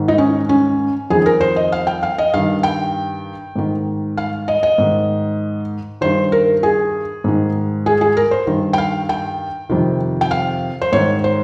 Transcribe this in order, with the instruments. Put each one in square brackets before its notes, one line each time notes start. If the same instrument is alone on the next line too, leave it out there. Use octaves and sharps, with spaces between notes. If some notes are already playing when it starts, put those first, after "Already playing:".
Already playing: [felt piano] G#2 D#3
D#4
C#4
C#4
F2 D#3 G#4
A#4
C5
D#5
F5
G5
F5
D#5
G2 D#3 F5
G5
G#2 D#3
F5
D#5
D#5
G#2 D#3
G2 D#3 C5
A#4
G#4
G#2 D#3
G#4
G#4
A#4
C5
G2 D#3
G5
F5
G5
F2 C3 D#3
G5
F5
C5
G#2 D#3 C#5
C5